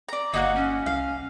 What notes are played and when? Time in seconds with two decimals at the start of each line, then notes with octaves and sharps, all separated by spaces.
0.09 D5 A#5
0.34 G1 A#3 D#4 F#4 F#5
0.55 C#4
0.86 C2 F5